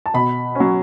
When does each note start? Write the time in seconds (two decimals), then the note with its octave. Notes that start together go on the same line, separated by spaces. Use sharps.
0.06 A5
0.14 B2 B5
0.55 F#3 C#4